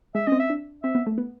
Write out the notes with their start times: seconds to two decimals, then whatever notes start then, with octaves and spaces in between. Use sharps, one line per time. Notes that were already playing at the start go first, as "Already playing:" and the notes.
0.15 G#3 E5
0.27 C4 C#4 D#5
0.39 E5
0.50 D4
0.83 C4 E5
0.95 B3
1.07 A3
1.18 B3